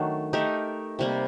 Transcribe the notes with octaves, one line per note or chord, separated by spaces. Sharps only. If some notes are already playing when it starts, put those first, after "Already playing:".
Already playing: D#3 F#3 A3 D4
A3 D#4 G4 A#4
C3 G3 A#3